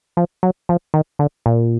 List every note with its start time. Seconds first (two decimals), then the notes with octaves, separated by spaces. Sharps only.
0.17 F3
0.43 F#3
0.69 F3
0.94 D#3
1.19 D3
1.46 A#2